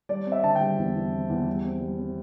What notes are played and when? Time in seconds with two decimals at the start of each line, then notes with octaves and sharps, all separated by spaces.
0.09 G3 D5
0.27 C4
0.32 E5
0.43 D3 A5
0.55 G5
0.61 G3
0.78 E2
0.95 E2
1.13 C4
1.30 E2
1.47 G3
1.64 C4
1.81 G3
1.99 C4